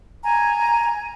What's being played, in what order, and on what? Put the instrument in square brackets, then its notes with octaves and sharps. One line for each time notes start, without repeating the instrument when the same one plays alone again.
[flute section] G#5 A#5